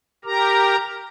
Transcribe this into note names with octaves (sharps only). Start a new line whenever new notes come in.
G4 A#4 A#5